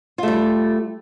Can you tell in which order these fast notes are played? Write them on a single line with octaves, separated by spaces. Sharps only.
F4 A3 G3